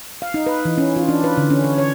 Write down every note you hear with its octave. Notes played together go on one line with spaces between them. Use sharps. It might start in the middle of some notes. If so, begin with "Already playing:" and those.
F5
D#4
B4
E3
C#4
F4
D4
B4
D3
C#4
C#5
C#5